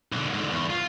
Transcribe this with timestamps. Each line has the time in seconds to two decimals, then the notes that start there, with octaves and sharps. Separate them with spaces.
0.12 B1 D3
0.34 G#2 D3
0.51 E2
0.70 F4